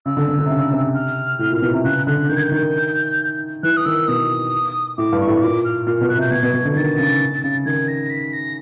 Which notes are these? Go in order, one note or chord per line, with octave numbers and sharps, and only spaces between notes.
C#3 E6
D3
D3
D3
C3
C#3
C3
F6
A2
A#2
B2
C3
C#3 F#6
D3 F#6
D#3 G6
G#6
G6
D#3
E3 F#6
D#6
D#3 E6
B2 D#6
A2 D6
G2
C#6
A2
A#2 D6
F6
A#2 F6
B2 F6
F#6
C3
G6
B2 G#6
B2
B2
D3
D#3 A6
C#3
C#3
D#3 G#6
A#6
B6
A#6